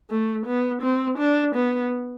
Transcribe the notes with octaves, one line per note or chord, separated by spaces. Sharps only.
A3
B3
C4
D4
B3